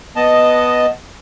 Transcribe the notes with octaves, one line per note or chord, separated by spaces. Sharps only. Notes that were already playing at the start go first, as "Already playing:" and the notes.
B3 D#5 A5